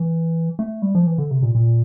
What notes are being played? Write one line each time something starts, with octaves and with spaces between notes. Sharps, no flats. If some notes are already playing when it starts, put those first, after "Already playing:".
Already playing: E3
A3
G3
F3
E3
D3
C3
A#2
A#2